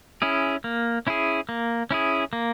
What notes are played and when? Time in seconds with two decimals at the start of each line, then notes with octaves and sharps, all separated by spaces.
0.22 C#4 E4 G#4
0.64 A#3
1.07 C#4 E4 G#4
1.49 A#3
1.91 C#4 E4 G#4
2.33 A#3